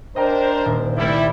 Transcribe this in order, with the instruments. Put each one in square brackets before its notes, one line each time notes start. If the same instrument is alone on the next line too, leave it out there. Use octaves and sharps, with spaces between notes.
[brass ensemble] D4 A#4 C5 [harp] D#5 G5 A#5
[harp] D#1
[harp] C2 A3 G#6 [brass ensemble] G3 E4